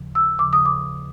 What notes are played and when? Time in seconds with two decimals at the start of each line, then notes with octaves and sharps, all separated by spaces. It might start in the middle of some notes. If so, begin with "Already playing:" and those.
Already playing: D#2 C#3 F3
0.15 E6
0.39 D#2 C#3 F3 D6
0.53 D#6
0.65 D6